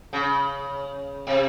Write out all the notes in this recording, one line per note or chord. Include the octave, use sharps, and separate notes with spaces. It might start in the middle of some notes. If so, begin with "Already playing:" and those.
C#3
C3